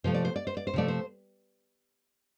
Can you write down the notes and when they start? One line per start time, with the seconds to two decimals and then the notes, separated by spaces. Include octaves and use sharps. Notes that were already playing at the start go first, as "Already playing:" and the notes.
0.04 C3 F3 A3 C5
0.14 D5
0.25 C5
0.36 D5
0.47 C5
0.57 D5
0.67 C5
0.73 C3 F3 A3 D5
0.88 C5